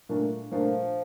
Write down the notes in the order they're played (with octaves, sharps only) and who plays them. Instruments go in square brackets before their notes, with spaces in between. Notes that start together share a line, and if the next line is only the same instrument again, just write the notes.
[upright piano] A#2 A3 D4 F4 A#4
[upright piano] A#2 A3 D4 F4 A#4 [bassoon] F3